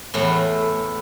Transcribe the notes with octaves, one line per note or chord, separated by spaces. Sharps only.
E2 A2 A3